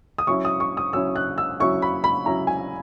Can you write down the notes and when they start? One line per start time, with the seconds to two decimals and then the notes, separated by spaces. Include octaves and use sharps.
0.18 D#6
0.27 F#3 C#4 E4 C#6
0.45 D#6
0.60 C#6
0.77 D#6
0.93 F#3 C#4 E4 E6
1.16 F#6
1.38 E6
1.60 F#3 C#4 E4 C#6
1.82 B5
2.04 B5
2.26 F#3 C#4 E4 A#5
2.47 G#5